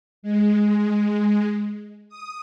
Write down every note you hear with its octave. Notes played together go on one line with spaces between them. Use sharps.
G#3
D#6